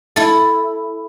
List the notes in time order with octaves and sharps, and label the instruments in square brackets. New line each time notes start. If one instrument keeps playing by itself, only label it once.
[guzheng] E4 A4